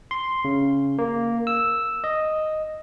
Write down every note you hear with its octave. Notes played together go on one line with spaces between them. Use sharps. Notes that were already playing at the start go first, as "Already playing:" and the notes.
C6
C#3
A#3
E6
D#5